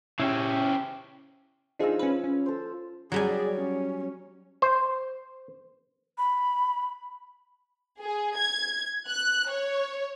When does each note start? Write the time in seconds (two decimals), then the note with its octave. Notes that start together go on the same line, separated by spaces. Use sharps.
0.20 C#3 C#4 E4 G4
1.79 F3 D4 D#4 G#4 F5 E6
1.99 C#4 B4
2.24 C#4
2.46 A4 C5
3.12 F#3 G3 G#4 D5 G#5
3.54 C#4
4.62 C5
6.18 B5
8.00 G#4
8.37 G#6
9.08 F#6
9.48 C#5